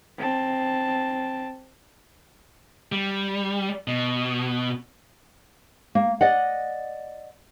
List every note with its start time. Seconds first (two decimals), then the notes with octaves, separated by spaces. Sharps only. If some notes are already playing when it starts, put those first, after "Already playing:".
0.18 C4 A5
2.92 G3
3.88 B2
5.95 A#3
6.21 D5 D#5 F#5